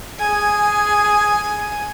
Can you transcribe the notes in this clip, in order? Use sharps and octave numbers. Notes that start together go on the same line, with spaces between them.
G#4 G#5